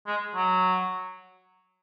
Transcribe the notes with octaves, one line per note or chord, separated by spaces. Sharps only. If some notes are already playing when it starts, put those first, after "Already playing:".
G#3
F#3